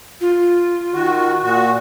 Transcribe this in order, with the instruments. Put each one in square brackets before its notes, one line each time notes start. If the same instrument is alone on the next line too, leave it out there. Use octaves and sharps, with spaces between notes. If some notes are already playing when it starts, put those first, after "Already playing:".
[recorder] F4
[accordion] D#3 F#4
A#2 F#4